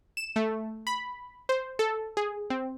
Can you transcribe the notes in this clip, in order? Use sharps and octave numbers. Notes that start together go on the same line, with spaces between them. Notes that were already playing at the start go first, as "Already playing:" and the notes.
E7
A3
B5
C5
A4
G#4
C4